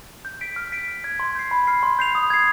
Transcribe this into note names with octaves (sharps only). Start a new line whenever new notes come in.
G6
B6 D7
F6
B6 D7
F6
G#6 B6
C6
G6 C7
B5
F6 C7
C6
G6 C7 F7
D#6
G#6 C7